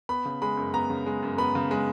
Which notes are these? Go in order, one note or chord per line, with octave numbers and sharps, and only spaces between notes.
B3 B5
C#3
G#3 B5
F#2
B3 A#5
C#3
G#3
F#2
B3 B5
C#3
G#3